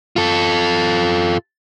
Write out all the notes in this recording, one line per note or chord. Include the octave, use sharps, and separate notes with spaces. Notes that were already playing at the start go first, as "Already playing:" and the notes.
F4 A4